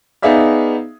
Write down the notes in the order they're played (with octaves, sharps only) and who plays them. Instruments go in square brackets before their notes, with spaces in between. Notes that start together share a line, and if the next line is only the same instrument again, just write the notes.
[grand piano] B3 D#4 G#4 D5 E5 F5